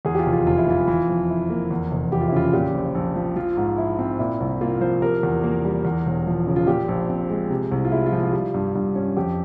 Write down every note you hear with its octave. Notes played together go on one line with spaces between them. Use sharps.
E2 G#4
G4
F4
F1
F4
F1 F4
E4
E3 F4
E3
F2
E4
A#3
E2
F1
E3 G4
F4
E4
C#3 F4
A#2 G4
A#1
A#1
F3
F3 F4
G#2
E4
C4
A#2 E4
C2
A#3 F4
F3 C5
C3 A#4
E2
A#3
G3
E2
E1
F3
C#3
F4
A#2 G4
A#1
C4
G#3
C3
C2
F4
G#3 E4
F4
F3
F4
G3 F4
G2
G2
C#4
F2 G4